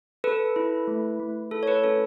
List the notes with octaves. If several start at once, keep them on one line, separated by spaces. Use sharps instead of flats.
A4 B4
E4
A3
A3
E4 A4
C#5
B4
C#4 A4